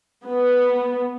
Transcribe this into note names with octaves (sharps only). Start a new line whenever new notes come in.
B3